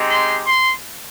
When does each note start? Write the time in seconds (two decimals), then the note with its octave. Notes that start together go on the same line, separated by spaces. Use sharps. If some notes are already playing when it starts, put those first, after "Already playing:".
Already playing: G#3 C4 D#4 G4
0.09 C6
0.45 C6